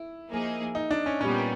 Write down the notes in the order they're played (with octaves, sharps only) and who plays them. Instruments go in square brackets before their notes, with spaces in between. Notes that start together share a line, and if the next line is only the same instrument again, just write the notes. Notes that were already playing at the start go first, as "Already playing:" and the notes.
Already playing: [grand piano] E4
[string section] F3 A#3 D#4 G#4
[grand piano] D#4
D4
C#4
[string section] A#2 G3 B3 D#4 [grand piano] C#4